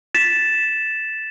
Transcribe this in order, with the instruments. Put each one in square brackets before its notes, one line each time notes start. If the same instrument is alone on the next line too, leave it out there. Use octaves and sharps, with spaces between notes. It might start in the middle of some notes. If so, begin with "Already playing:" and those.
[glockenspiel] A6 B6 E7